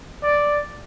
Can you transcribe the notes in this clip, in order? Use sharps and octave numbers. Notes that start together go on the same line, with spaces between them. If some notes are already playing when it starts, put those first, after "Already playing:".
D5